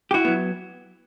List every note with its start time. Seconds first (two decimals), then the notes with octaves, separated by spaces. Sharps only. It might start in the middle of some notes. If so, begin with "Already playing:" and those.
0.11 G4
0.14 E4 F#4
0.25 F#3 B3